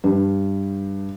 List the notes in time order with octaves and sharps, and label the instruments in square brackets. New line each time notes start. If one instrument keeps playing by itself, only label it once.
[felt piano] G2